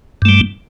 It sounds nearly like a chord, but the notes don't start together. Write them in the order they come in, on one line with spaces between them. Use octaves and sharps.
G2 A3 G3